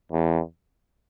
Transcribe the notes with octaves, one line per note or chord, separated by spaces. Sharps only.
E2